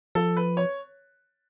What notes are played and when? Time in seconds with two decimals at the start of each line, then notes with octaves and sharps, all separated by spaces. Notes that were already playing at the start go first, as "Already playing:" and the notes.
0.15 F3 A4
0.37 B4
0.57 C#5